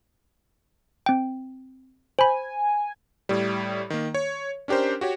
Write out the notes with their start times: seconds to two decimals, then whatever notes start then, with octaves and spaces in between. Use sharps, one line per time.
1.06 C4 G5
2.19 C5 G#5 B5
3.29 A2 G3
3.90 D#3 A#3
4.14 C#5
4.68 C#4 D4 G4 A#4 C5
5.01 F#4 G4 C#5